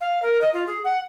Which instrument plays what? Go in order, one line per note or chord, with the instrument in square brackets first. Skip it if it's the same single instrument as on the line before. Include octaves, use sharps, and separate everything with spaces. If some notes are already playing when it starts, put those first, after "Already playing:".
[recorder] F5
A#4
D#5
F4
G#4
F#5